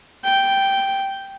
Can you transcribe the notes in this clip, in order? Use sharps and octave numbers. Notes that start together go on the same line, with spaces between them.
G5